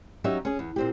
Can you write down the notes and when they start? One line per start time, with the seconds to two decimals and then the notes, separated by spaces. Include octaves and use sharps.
0.24 F#3 C#4 D#4 G4 C#5 E5
0.45 C#4 G#4
0.59 E2
0.76 A#2 C4 G4